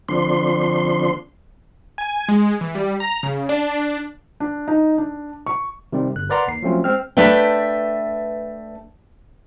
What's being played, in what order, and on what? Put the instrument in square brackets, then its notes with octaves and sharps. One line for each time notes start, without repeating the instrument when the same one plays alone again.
[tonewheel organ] D3 F3 C4 D4 C6
[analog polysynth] G#5
G#3
E3
G3
A#5
C#3
D4
[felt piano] D4
D#4
D4
C#6
[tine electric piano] C3 D#3 G3 C4
G1 F#6
A#4 B4 D5 F#5 A#5 C6
D#2 C7
F3 F#3 A3 C4 C#4 F4
G#3 C4 F6
[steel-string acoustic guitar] A3 D4 B4 E5 G5